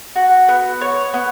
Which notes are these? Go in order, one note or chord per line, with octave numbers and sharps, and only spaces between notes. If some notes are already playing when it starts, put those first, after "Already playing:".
F#4
B3
C#5
B3